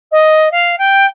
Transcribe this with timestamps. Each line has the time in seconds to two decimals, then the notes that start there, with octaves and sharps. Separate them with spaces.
0.11 D#5
0.51 F5
0.78 G5